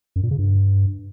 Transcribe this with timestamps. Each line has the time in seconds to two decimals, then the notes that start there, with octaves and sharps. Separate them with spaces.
0.16 F#2
0.23 A#2
0.31 C#3
0.39 G2